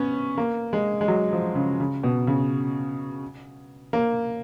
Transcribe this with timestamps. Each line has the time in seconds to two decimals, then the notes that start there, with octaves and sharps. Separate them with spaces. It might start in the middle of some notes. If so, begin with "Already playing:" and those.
Already playing: B3 C#4
0.38 A#3
0.73 G#3
1.01 G#3
1.08 F#3
1.33 F3
1.55 C#3
1.80 C#3
2.03 B2
2.27 C#3
3.93 A#3